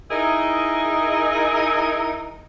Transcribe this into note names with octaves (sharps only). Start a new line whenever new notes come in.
D#4 E4 G#4 A#4 D#5